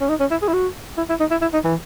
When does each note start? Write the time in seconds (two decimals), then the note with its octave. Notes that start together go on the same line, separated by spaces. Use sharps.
0.01 C#4
0.09 D#4
0.20 C#4
0.31 E4
0.42 G#4
0.48 E4
0.53 F#4
0.97 E4
1.09 E4
1.20 D#4
1.31 E4
1.42 E4
1.53 D#4
1.64 E3